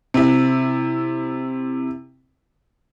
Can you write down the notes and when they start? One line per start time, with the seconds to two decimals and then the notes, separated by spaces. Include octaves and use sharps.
0.14 C3 E4